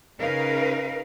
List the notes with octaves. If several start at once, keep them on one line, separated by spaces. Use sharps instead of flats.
C#3 D#4 A#4 B4 F5